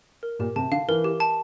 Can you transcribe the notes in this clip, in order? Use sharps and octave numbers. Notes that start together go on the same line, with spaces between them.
A#4
A#2 G4
C3 A5
D3 F5
E3 A#4
G4
A5